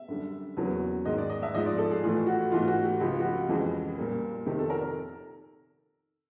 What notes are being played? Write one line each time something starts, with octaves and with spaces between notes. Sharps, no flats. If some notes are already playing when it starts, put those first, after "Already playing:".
Already playing: E5
F#2 D3 G3
E2 C#3 F#3 A#3
G#2 D#3 G#3 D#5
D5
D#5
E5
G#2 F3 G#3 D#5
D5
A4
G#4
A2 E3 A3 F4
F#4
G#2 E3 A3 F4
F#4
G4
C#2 C#3 F3 G4
F#4
G4
F2 C#3 E3 G#3
A#2 G3 A#3
F2 C3 D#3 G4
A4
A#4
A#4